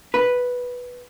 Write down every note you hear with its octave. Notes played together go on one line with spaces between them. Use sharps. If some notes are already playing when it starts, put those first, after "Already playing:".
B4